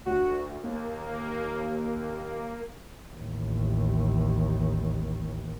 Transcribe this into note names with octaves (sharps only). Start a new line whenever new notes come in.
D2 F#4
D#2 A#3
A1 D#2